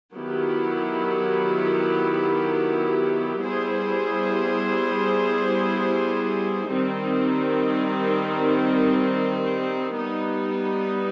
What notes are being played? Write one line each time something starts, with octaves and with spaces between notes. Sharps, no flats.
D#3 F#3 B3 E4 G4
G3 B3 E4 G#4 C5
D#3 G3 C4 D#4
G3 B3 D#4